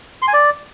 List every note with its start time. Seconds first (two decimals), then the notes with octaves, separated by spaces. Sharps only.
0.22 C6
0.28 G#5
0.33 D5